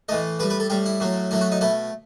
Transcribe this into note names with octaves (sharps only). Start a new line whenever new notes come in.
A2 E3 A3 D#5
A2 G3 B4
B4
A4
A2 G3 G4
E4
A2 F#3 A3
A2 F#3 A3 E4
F#4
D#4
B2 A3 E4